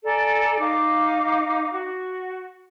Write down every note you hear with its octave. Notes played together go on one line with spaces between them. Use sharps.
A4 D5 G#5 A#5
D#4 F5 D6
F#4